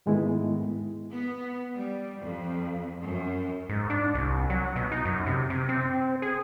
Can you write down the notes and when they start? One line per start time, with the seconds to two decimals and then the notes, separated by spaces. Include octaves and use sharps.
0.06 G#2 D#3 G#3 A3 B3 E4
1.12 B3
1.75 G3
2.21 F2
3.03 F#2
3.69 G#2
3.90 D4
4.14 C2
4.50 F#3
4.76 B2
4.91 D#4
5.05 F#2
5.26 C3
5.50 C3
5.69 C4
6.22 G#4